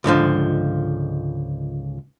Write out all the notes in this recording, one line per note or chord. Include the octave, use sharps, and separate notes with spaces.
C#2 G#2 D3 F3